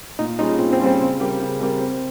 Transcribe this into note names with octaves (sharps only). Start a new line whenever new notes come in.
A#2 D#4
G3 C#4 D#4 F4 G#4
A#2 C4
C4
G3 C#4 F4 G#4
C4
C#3
G3 C4 G4 A#4
C#3
G3 C4 G4 A#4
C4